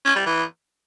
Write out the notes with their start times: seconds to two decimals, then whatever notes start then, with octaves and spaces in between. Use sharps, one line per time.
0.05 C#4
0.16 G3
0.26 E3